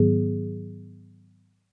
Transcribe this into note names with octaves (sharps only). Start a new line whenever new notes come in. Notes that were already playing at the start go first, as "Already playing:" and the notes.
Already playing: G#2 D#3 F#3 B3 G#4